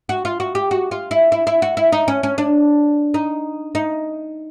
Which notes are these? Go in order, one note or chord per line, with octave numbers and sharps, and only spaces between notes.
F#4
F4
F#4
G4
F#4
F4
E4
E4
E4
F#4
E4
D#4
C#4
C#4
D4
D#4
D#4